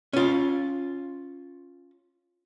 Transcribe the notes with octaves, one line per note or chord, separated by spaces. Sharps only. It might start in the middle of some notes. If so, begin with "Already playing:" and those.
C#4 F4